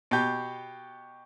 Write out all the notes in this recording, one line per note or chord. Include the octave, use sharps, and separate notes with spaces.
B2 G4